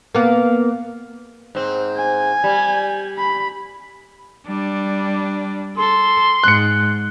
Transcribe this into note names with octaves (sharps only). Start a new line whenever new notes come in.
A#3 B3
G#2 C4
G#5
G3
B5
G3 D4
A4 C6
G#2 F#6 C#7